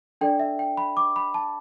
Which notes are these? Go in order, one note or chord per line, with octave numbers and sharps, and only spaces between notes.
D4 A4 D5 G5
E5
G5
B5
D6
B5
A5